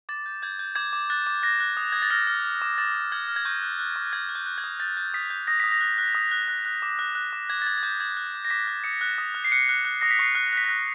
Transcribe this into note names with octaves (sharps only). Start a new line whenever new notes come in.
D6 A6
G6
G6 G#6
G6
D6 G#6
D6
F#6 A6
D6
F#6 A#6
F#6
D#6
D#6 G#6
A6
F6 A#6
F6
F6
D6
D6 A6
D6
F6 G#6
F6
G#6
C#6 G6
F#6
F#6
C#6
F#6 G#6
F#6
G6
F#6
G#6
D#6
G6 A6
G6
D#6 B6
G6
D#6 A#6
D#6 B6
A#6
F#6
F#6
D#6
F#6
F#6
F#6
D6
F#6
F#6
D6
D6 G#6
A6
D6 G#6
G#6
D6 G6
D6 G#6
F#6
D6
A#6
D6 B6
F#6
D#6 C#7
F#6
D#6
F#6
C7
F#6 C#7
F#6
F#6
D#6 A#6
B6
C#6 C7
F#6
F#6 B6
F#6 A#6